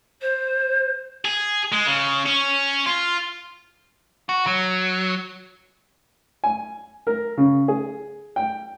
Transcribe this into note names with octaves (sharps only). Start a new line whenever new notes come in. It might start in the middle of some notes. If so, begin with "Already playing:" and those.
C5
G#4
G#3
C#3
C#4
F4
F#4
F#3
G#5
A#4
C#3
G#4
G5